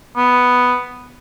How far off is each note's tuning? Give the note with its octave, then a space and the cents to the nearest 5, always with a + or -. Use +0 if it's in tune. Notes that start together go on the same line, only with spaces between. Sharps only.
B3 +5